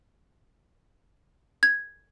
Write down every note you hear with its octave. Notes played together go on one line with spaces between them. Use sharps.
G#6